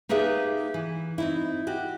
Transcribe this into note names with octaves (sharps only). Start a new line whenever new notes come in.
A#3 D#4 G4 G#4 B4 E5
E3
C4 D#4 E4
F#4 G4